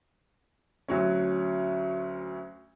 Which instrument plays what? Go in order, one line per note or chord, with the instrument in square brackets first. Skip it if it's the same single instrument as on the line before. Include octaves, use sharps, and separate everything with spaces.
[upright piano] D2 F#3 C#4